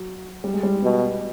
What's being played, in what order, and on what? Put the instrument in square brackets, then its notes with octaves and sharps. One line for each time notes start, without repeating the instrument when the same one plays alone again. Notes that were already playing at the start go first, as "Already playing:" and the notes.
Already playing: [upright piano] F#3
G3
G#3
G3
[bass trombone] B2